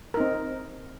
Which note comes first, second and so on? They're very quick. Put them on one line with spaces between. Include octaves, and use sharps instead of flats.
A#4 D#4 C4